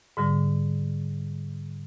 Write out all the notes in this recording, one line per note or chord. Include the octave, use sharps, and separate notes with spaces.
G#2 D3 G3